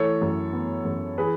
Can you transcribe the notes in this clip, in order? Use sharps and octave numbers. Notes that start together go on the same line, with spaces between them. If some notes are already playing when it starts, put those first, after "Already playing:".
Already playing: E3 A3 A4 C#5
F#2
B3
F#2
E3 G#4 B4